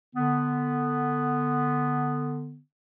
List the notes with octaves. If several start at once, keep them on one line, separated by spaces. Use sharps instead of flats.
D3 B3